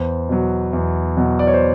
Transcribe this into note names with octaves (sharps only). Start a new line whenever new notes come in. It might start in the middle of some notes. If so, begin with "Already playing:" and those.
Already playing: E2 C5
B2 F#3
E2
B2 F#3
D5
C#5
C5